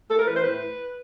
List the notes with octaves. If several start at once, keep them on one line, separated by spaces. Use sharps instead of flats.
A2 A4
A#4
E3 B4
C5
A2 B4